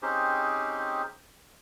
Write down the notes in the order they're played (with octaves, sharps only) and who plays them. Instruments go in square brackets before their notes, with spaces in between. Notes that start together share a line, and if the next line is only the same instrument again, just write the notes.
[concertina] C4 C#4 D#4 G4 G#4 C5